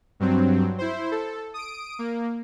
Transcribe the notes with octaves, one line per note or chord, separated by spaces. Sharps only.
G2 F#3 C4
E4 C5
A4
D#6 D7
A#3